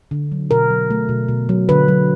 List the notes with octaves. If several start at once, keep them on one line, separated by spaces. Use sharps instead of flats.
D3
F#3
B2 A#4
F#3
A3
B2
B2
F#3
D3 B4
F#3